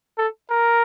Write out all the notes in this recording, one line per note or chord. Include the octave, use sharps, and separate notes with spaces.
A4
A#4